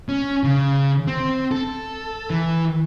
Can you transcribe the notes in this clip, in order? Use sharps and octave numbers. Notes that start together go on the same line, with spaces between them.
C#4
C#3
C4
A4
E3